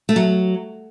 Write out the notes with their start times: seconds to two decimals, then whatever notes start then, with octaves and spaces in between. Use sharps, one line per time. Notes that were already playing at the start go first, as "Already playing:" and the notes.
0.09 A3
0.16 F#3